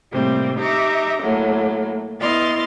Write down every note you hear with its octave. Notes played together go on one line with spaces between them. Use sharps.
A2 C3 G3 A#3 C4
D#4 G4 E5 A#5 D6
A2 F#3 A#3
B3 E4 D#5 C6 F6 A6